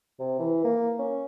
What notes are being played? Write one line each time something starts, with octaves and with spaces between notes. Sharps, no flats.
C3
E3
A#3
C#4